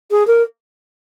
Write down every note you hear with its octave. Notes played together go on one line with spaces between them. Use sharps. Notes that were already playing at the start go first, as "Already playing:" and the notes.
G#4
A#4